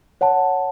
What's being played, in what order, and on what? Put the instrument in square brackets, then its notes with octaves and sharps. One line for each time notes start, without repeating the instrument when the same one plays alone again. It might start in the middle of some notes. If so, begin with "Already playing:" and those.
[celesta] C#5 F#5 A5